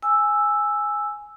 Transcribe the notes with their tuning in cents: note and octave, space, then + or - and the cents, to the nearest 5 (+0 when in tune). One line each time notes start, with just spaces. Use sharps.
G#5 +0 E6 +0